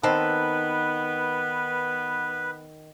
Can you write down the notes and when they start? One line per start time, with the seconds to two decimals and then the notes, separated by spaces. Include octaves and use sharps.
0.03 D#3 B3 C4 A4 B4